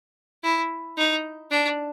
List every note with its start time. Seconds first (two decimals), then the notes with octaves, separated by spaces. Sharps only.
0.43 E4
0.97 D#4
1.51 D4